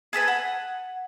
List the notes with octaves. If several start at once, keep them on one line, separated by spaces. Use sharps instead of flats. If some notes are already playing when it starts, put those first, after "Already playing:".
G#4 A4 B4 G#5
F#5